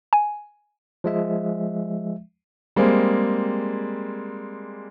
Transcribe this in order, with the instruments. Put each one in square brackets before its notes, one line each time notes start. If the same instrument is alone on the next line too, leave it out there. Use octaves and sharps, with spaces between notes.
[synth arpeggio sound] G#5
[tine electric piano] F3 G#3 E5
[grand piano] G3 G#3 A#3 C4 G#4